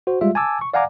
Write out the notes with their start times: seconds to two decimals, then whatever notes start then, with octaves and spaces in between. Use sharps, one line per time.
0.07 F#4 C5
0.21 G3 G#3 F4 E5
0.35 G#5 A5 D6 E6
0.61 C#6
0.74 D5 F5 F#5 G#5 A#5 D6